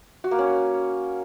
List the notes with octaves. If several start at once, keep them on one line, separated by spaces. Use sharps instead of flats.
F#4
A#3
C#4